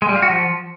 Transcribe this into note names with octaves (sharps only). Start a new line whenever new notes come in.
G#3
G3
F4
F#4
F3